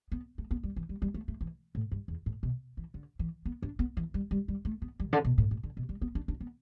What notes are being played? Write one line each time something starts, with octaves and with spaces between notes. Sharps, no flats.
B3
A3
B3
G3
E3
G3
G3
A3
A3
E3
A2
G2
E2
A2
B2
E3
D3
E3
B3
D4
B3
E3
G3
G3
G3
A3
B3
G3
B2
D3
B2
A2
A2
D3
B2
G3
B3
D4
D4
B3